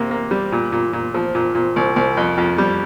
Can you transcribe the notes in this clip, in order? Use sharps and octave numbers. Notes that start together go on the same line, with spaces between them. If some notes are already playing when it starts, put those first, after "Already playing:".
Already playing: C3 A#3
A#3
G3
A#2
A#2
A#2
F3
A#2
A#2
C2
C2
F2
F2
G3